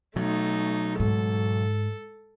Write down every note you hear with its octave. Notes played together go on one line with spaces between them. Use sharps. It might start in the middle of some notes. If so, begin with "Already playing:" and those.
B2 F#3 A3 D#4
G#2 A4